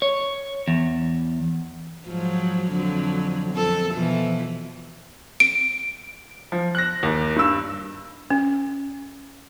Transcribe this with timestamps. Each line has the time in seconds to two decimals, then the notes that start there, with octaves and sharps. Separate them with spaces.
0.02 C#5
0.68 E2
2.06 G#2 F3 F#3
2.71 F2 D3 F#3
3.52 F2 A4
3.93 B2 E3 F3
5.40 D7
6.52 F3
6.75 F#6 A#6
7.03 D#2
7.36 G2 E6
8.30 C#4